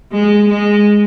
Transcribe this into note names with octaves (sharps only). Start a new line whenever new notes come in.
G#3
G#3